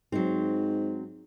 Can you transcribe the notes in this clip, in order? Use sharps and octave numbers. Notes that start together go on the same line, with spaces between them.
G#2 F#3 C4